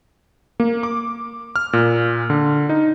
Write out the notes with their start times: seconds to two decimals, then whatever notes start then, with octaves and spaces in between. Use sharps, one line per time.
0.60 A#3
0.83 D6
1.56 F6
1.73 A#2
2.30 D3
2.69 D#4